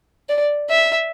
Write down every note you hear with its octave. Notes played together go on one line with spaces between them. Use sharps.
D5
E5